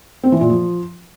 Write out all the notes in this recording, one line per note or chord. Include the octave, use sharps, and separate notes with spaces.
C4
E3
A#2
F3